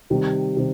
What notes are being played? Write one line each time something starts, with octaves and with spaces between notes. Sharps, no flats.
C3 D#3 G3
C3 D#3